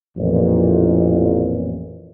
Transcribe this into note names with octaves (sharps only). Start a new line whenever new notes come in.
A1 F2 A#2